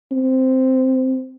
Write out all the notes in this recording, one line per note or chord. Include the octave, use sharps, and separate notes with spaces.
C4